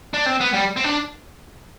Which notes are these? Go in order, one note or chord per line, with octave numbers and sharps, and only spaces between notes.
D4
C4
B3
G3
C4
D4